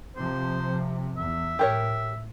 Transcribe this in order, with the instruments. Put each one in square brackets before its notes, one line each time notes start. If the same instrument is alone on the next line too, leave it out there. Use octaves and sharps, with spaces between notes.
[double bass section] C3 F3 [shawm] C5
[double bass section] E2 [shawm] E5
[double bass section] A2 [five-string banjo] G4 A#4 C#5